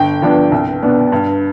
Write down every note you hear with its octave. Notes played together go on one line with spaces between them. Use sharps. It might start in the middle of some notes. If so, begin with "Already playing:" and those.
Already playing: G1 G5
G2 F3 B3 D4
C2
B2 B3 D4
G2